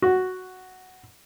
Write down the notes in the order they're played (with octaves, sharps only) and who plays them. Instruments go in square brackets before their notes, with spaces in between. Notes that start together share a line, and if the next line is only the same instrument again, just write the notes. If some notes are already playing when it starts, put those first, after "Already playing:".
[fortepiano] F#4